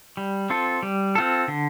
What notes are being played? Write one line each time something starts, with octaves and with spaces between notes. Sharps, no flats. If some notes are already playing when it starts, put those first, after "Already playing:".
G3
C4 F4 A4
G3
C4 F4 A4
D3